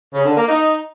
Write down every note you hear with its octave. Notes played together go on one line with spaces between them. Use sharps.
C#3
D3
A#3
D#4